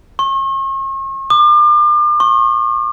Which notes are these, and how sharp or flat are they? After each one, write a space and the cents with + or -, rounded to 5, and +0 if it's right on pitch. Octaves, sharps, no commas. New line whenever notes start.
C#6 -40
D6 +40
C#6 -35